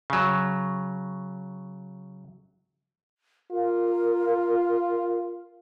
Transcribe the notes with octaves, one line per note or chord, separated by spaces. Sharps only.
C#3 F#3
F4 A#4